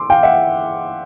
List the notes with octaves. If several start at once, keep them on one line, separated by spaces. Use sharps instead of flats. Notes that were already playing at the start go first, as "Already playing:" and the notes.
Already playing: C6 D6
F5 G5
E5 F#5